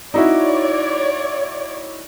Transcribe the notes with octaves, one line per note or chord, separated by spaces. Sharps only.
D#4 E4 F#4 C#5 D5